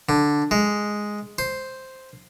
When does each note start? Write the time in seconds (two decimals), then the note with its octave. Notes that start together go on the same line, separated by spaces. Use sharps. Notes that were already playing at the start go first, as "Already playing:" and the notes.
0.09 D3
0.51 G#3
1.39 C5